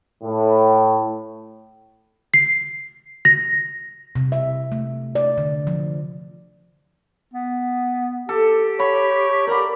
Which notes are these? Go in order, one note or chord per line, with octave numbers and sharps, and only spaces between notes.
A2
C7
A#6
C3
E5
A3
D5
D3
F3
B3
G4 A4
C#5 B5
A#4 D5 B5